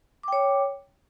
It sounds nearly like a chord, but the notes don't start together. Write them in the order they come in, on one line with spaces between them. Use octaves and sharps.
D6 G5 C#5